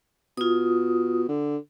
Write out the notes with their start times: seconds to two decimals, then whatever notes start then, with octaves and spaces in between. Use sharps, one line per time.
0.37 B2 F4 D#6
1.28 D3